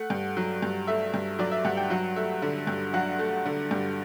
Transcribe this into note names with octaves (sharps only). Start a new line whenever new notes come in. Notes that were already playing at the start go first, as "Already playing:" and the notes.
Already playing: A3 F#5
G2
F#3
G2
A3 E5
G2
F#3 D5
E5
G2 F#5
G5
F#3 F#5
A3 E5
D3
G2
F#3 F#5
A3
D3
G2